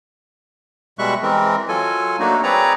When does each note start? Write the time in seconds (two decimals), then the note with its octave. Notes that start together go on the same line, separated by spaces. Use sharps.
0.99 B2 G3 G#3 E5 C#6 F#6
1.23 E3 G#3 C4 A#4
1.68 F#3 F4 A4 G#5
2.20 F#3 A3 A#3 D4 D#4 F#4
2.43 C4 G#4 B4 C#5 D5 A#5